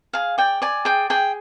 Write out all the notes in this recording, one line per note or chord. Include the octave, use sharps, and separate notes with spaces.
G#4 F5
D5 G5
D5 G#5
G#4 G5
G#4 G5